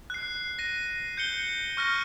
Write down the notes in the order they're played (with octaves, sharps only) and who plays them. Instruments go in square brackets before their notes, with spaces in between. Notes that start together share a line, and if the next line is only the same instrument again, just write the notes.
[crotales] F#6 C7
A#6 D#7
G6 C#7 G7
C#6 F6 F#6 A#6